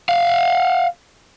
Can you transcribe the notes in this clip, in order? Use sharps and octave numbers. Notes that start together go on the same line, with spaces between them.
F5 F#5